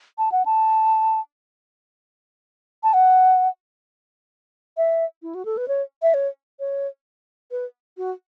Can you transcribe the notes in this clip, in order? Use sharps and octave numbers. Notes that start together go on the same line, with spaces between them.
A5
F#5
A5
A5
F#5
E5
E4
F#4
A4
B4
C#5
E5
C#5
C#5
B4
F#4